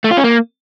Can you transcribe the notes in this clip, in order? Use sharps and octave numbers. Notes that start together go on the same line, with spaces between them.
A3
F4
C#4
A#3